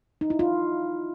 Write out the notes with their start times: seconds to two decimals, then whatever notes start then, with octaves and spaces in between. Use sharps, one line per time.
0.21 D#4
0.30 E4
0.39 F4